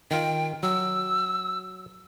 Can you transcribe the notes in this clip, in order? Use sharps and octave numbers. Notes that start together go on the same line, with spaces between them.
D#3 F4 G5
F#3 E6